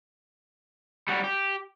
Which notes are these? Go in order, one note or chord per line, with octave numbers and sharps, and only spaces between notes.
G3 F#4
G4